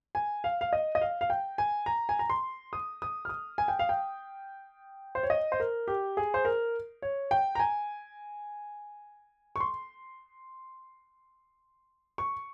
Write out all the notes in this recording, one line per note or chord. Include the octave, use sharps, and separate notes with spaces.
G#5
F5
F5
D#5
D#5
F5
F5
G5
G#5
A#5
G#5
A#5
C6
D#6
D#6
F6
D#6
G#5
G5
F5
G5
C5
C#5
D#5
C5
A#4
G4
G#4
C5
A#4
C#5
G5
A#5
G#5
C#6
C6
C#6